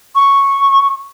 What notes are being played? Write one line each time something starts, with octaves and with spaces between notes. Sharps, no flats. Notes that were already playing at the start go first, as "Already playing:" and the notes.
C#6